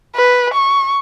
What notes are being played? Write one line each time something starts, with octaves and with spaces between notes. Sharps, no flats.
B4
C#6